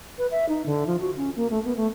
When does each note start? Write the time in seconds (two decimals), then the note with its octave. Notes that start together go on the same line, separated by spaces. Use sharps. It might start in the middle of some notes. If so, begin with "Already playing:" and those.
0.18 B4
0.31 E5
0.49 D#4
0.66 D3
0.87 F3
1.00 F#4
1.17 C#4
1.36 A#3
1.50 A3
1.65 B3
1.76 A3